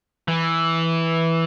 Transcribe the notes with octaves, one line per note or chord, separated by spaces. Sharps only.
E3